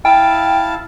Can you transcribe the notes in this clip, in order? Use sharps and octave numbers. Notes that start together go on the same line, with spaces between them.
E4 F5 G5 A5